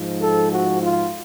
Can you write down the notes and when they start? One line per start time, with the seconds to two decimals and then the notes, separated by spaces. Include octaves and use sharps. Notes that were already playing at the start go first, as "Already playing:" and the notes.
Already playing: G#2 F3
0.20 A4
0.51 F#4
0.82 F4